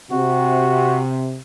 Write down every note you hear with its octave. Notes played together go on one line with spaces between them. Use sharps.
C3 F#4